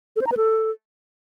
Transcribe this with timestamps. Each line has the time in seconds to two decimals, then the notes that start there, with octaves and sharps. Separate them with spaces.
0.16 A4
0.21 C5
0.27 A#5
0.32 B4
0.37 A4